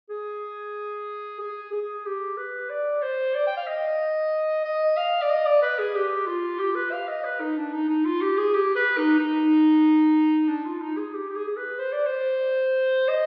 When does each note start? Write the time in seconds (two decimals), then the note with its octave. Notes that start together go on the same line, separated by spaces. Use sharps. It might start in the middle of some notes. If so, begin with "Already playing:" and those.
0.10 G#4
1.40 G#4
1.72 G#4
2.05 G4
2.37 B4
2.70 D5
3.02 C5
3.35 D5
3.47 G5
3.57 F5
3.67 D#5
4.64 D#5
4.97 F5
5.22 D5
5.30 D#5
5.46 D5
5.62 B4
5.78 G#4
5.95 G4
6.27 F4
6.59 G4
6.75 B4
6.92 F5
7.08 D#5
7.24 B4
7.40 D#4
7.57 D4
7.73 D#4
7.89 D#4
8.05 F4
8.21 G4
8.38 G#4
8.54 G4
8.75 B4
8.97 D#4
9.19 D#4
10.48 D4
10.65 F4
10.81 D#4
10.97 G#4
11.13 G4
11.29 G4
11.35 G#4
11.47 G#4
11.57 B4
11.79 C5
11.92 D5
12.06 C5
13.08 D#5